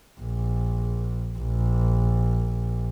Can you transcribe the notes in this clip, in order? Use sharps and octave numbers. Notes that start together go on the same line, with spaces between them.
A#1
A#1